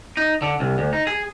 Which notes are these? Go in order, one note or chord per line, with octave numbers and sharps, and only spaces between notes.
D#4
D3
C2
D2
D#4
G#4